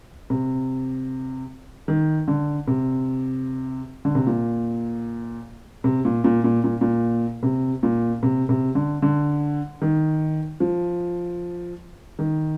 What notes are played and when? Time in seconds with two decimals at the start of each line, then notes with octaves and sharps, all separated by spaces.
0.30 C3
1.88 D#3
2.28 D3
2.67 C3
4.05 D3
4.15 C3
4.27 A#2
5.84 C3
6.05 A#2
6.24 A#2
6.44 A#2
6.64 A#2
6.81 A#2
7.43 C3
7.83 A#2
8.23 C3
8.49 C3
8.75 D3
9.02 D3
9.82 D#3
10.60 F3
12.19 D#3